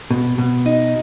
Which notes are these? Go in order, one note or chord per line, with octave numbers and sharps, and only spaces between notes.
B2
B2
D#4